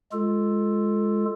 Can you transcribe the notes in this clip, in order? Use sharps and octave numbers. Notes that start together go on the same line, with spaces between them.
G#3 F4 A4